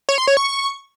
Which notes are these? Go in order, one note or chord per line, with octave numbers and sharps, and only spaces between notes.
C#5
C6
C#5
C#6